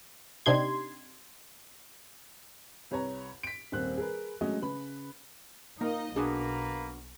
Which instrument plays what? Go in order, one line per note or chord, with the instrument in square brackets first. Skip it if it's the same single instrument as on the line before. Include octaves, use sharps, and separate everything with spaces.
[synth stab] C3 D4 D#4 G4 C6 G#6
[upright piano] C2 B4 C#5 A#5
B6 D7
D#1 A#3 C4 F#6
G#4 A#4 B4
F#3 G#3 A3 C#4 D#5
C#3 B4 B5
[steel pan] A#3 [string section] D#4 D#5 [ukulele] A#4
[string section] B1 [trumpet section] A#3 A#4 B4 [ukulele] D4 F#4 [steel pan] G#4